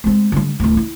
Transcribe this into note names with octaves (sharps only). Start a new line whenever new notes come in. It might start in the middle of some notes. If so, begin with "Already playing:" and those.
G#3 C4
D3 G3
D1 D#3
E4